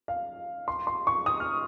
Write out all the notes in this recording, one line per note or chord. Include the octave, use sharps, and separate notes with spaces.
F5
C6
C6
C#6
D#6
F6